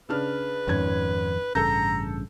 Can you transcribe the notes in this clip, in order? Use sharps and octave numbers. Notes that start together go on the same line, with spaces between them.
C#3 D4 B4 F6
G#1 F2 D#3 C#4 G#6
A1 G2 C#3 A4 A#5 G6